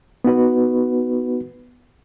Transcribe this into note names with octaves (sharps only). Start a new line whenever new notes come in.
B3 D#4 F#4 B4